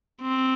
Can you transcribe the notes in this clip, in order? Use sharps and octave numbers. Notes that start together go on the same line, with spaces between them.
C4